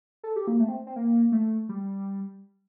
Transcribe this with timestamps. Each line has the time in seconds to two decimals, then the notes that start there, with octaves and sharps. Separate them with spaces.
0.23 A4
0.36 G4
0.47 A#3
0.59 A3
0.69 C4
0.87 C4
0.96 A#3
1.32 A3
1.69 G3